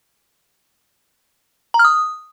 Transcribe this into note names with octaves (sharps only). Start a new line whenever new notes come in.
A#5
F6
D#6